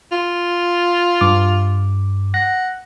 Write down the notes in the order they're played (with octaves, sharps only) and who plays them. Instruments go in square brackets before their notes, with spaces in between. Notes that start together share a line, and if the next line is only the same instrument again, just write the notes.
[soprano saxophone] F4
[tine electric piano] G2 D6
[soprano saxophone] F#5 [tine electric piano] A#6